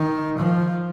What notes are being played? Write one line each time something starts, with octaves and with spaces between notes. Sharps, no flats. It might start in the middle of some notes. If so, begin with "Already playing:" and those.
Already playing: D#3
F3